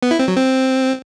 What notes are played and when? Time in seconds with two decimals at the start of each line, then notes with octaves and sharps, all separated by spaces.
0.03 B3
0.11 E4
0.19 C4
0.28 F#3
0.36 C4